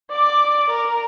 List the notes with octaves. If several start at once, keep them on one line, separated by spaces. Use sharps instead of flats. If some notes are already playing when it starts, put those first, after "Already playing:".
D5 D6
A#4